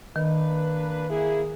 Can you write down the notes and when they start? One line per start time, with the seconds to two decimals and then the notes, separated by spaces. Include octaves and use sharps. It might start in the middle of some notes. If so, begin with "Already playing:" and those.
0.16 D#3 A#3 D4 B4
1.09 A#3 E4 G#4